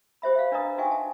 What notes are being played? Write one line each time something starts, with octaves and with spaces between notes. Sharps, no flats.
G4 C5 E5 B5
E5 F5
D4 B4 D5 D#5 A#5 D#6
D#4 F#4 E5 G5 G#5 C#6
A5